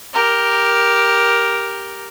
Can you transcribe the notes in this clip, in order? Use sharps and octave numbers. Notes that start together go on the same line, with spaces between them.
G4 A#4